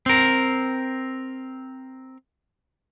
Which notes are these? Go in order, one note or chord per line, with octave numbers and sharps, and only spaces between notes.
C4 A#4